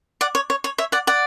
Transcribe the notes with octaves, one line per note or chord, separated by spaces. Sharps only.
D5 F#5
C#5
C#5
C#5
C#5 E5
D5 F#5
D5 F#5